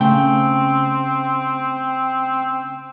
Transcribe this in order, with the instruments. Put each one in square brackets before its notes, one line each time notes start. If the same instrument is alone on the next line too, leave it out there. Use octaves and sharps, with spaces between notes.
[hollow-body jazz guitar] C#3 A3 G5 [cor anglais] C4